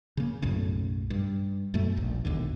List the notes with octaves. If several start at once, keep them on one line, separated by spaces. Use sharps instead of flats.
C#3 A#3
B1 F#2 A2 C#3
G2
F#2 B2 A3
D#1 A#1
G#1 D#2 B2 D3